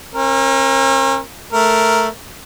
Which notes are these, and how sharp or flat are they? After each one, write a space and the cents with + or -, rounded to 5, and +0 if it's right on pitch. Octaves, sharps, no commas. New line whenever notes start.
C#4 -45 A#4 +0
A3 +0 A#4 +0